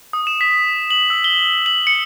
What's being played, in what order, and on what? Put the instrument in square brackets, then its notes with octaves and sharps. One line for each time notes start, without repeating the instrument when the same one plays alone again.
[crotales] D#6
E7
B6
F#7
E6
G7
F#7
C#7